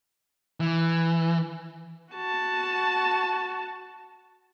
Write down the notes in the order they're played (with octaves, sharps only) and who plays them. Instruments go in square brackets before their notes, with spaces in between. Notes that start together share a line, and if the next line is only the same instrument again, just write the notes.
[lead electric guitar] E3
[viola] F#4 A5